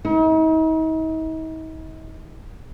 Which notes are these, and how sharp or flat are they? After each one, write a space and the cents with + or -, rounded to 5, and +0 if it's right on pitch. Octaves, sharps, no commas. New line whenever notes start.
D#4 +40